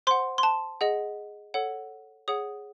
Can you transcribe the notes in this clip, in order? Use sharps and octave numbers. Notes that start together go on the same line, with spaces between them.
C5 F#5 C6
C6
A5
G#4 D#5 F#5
A4 C#5 F#5
G#4 C#5 F#5 D#6